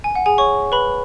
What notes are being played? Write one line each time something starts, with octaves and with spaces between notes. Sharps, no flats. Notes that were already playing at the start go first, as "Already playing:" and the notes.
G#5
F#5
G#4 G#5
C#5 C#6
B4 B5